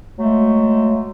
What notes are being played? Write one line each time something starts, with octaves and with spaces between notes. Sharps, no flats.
F#3 G#3 A3